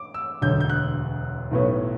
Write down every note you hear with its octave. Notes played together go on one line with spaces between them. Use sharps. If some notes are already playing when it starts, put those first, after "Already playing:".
Already playing: D6
E6
E1 D2 D3 F#3 G6
G6
F#6
B1 A2 F#3 B3